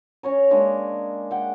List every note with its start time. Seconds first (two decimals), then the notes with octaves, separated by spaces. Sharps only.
0.23 C#4 C#5 A#5
0.51 G#3 A#3 D4
1.31 F#5 G5